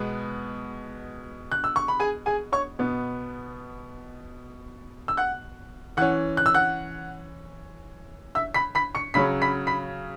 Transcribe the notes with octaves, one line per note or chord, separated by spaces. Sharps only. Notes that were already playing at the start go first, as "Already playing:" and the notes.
Already playing: B2 G#3 B3
F#6
E6
C#6
B5
G#4 G#5
G#4 G#5
C#5 C#6
B2 B3
E6
F#5 F#6
E3 C#4 F#5 F#6
F#6
E6
F#5 F#6
E5 E6
B5 B6
B5 B6
C#6 C#7
C#3 F#3 C#4 B5 B6
B5 B6
B5 B6